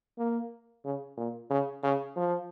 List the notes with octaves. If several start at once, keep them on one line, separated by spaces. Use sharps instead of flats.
A#3
C#3
A#2
C#3
C#3
F3